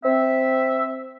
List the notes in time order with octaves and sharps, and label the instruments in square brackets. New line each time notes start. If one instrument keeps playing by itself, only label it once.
[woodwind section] C4 E5